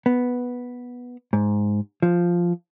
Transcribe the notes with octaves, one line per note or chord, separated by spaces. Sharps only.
B3
G#2
F3